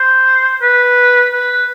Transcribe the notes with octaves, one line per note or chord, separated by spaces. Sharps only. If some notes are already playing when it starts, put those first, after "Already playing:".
Already playing: C5
B4
B4